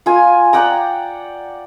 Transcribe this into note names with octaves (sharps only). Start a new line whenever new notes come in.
F4 G#5
D5 F#5 G5 A#5